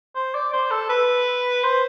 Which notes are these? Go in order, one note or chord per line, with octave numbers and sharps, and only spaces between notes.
C5
D5
C5
A4
B4
C5